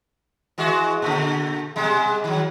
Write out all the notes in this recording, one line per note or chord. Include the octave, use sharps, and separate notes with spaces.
E3 G#3 F#4
A#2 D3
B2 G3 G#3
D#3 F#3